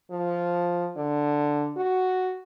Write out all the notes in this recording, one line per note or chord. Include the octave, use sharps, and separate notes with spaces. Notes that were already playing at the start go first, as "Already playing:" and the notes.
F3
D3
F#4